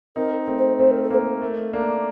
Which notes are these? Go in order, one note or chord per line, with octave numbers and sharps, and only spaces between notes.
C4 D#4 A#4
A3 C4
C5
A3 C4 C5
A#4
A4
A#3 C5
A#4
A3
A#3 D4